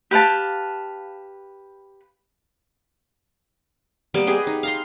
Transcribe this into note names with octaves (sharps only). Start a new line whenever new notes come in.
G4 B4 F5 A5
G3 A#3 B3
G4 G#4 B4 D#5
D#4
F5 A#5 C6